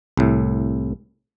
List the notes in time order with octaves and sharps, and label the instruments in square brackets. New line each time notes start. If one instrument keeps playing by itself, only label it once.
[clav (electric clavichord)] C2 A2